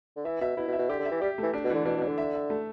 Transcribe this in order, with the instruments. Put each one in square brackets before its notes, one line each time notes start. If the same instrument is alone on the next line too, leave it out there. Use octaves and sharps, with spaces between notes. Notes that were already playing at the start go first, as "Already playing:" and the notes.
[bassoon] D3
[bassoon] E3 [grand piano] E5
[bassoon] B2 [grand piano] E5
[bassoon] B2 [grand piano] E4
[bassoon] B2
[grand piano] E5
[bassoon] B2
[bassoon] D3 [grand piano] G4
[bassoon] D3
[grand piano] E5
[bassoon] E3
[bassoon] G3 [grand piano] G4
[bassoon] E3 [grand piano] A3
[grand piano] D4
[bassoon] B2
[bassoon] D3 [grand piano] E3
[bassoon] B2 [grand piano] D4
[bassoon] B2
[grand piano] D4
[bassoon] D3
[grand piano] E5
E5
A3